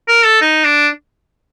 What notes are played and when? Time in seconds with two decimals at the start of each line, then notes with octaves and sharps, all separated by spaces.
0.08 A#4
0.25 A4
0.41 D#4
0.65 D4